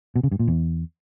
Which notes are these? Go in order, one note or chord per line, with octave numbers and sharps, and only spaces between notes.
B2
C#3
G2
A#2
E2